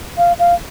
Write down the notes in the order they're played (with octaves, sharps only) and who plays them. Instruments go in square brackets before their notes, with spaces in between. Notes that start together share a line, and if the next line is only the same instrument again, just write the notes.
[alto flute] F5
F5